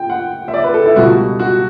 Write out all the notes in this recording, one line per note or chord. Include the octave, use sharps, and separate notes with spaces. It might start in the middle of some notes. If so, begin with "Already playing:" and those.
Already playing: G5
F#5
E5
D5
B4
A4
E4
C#2 B2 G3 F#4
F#4